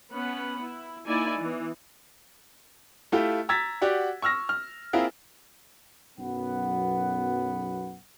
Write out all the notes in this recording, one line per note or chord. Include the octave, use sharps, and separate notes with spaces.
B3 C#4 F#5 B5
E4
A#3 D#4 E4 D5 G#5
E3 B3
A3 E4 F4 G4
A#5 E6 G#6 A6 B6
F#4 G4 D5 F#5
C#6 E6 F6 A#6
F6
A#3 C4 E4 F4 G#4 A#4
B1 F#2 B3 F#5